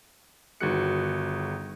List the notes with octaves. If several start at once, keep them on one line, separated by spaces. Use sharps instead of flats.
G1 D#3 F#4 G#4 F#6 C#7